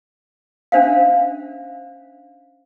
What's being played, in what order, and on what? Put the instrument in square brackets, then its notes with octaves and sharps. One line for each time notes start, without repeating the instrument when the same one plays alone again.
[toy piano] C#4 D4 C5 E5 F5